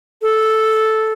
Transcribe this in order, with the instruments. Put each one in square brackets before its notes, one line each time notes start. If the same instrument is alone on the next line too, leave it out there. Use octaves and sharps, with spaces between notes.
[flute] A4